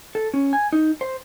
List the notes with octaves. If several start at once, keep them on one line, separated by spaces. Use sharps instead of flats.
A4
C#4
G#5
D#4
C5